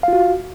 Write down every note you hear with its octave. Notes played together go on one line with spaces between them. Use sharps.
F4 F#4 F5